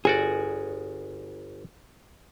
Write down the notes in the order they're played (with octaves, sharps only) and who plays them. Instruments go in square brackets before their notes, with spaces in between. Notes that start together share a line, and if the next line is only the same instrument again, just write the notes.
[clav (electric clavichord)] G1 F#4 D5 [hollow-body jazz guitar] G#4